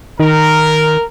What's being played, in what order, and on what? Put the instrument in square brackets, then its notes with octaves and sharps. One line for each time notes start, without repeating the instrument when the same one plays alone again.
[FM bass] D#3 [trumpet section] A#4